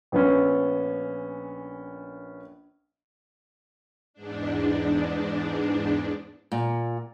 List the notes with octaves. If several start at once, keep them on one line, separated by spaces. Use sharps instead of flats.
A#1 B3 C#4
E2 G#2 D4
A#2